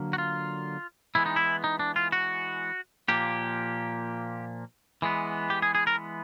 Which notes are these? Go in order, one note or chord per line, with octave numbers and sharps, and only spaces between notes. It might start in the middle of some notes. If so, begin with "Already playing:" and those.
Already playing: D3 F#3 A#3
F#4
F4
E3 G#3 B3 E4
D#4
E4
D#4
D4
F4
F#4
A#2 F3 A#3 G4
E3 G#3 B3
G4
G#4
G#4
A#4